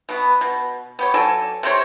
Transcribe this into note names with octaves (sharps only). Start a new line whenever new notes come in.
B2 B3
B2
B3 G4 C#5
F#3 A4 D5 G#5
C3 C4 C5 C#5